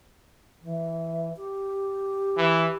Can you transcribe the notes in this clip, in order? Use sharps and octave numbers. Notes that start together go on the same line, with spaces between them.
E3
G4
E3